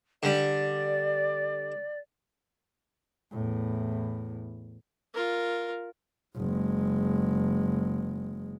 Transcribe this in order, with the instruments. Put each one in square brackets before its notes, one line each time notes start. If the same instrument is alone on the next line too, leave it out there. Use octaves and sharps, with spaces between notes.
[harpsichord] D3 G3 [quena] D5
[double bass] E2 A2
[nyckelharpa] F4 A#4
[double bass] F#1 G#3